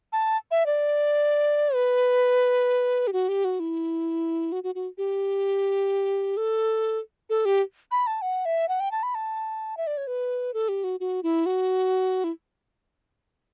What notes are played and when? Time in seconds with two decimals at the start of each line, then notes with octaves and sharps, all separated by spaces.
0.13 A5
0.51 E5
0.66 D5
1.75 B4
3.07 G4
3.13 F#4
3.29 G4
3.45 F#4
3.60 E4
4.52 F#4
4.64 F#4
4.75 F#4
4.98 G4
6.37 A4
7.30 A4
7.45 G4
7.91 B5
8.07 A5
8.22 F#5
8.45 E5
8.69 F#5
8.80 G5
8.91 A5
9.03 B5
9.15 A5
9.77 E5
9.87 D5
9.97 C#5
10.07 B4
10.54 A4
10.69 G4
10.84 F#4
11.00 F#4
11.23 E4
11.46 F#4
12.24 E4